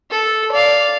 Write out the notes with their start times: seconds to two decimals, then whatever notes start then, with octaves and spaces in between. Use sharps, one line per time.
0.11 A4
0.52 D5 F5